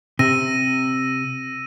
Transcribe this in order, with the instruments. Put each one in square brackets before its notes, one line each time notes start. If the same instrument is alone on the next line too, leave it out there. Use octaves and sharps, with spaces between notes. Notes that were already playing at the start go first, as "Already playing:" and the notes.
[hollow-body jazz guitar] C3 [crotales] E6 A#6 D#7